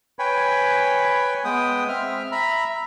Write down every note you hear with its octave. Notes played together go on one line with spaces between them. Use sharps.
B4 C#5 G5 G#5 B5
G#3 B3 G5 D#6
C4 E5 F6
E5 A#5 B5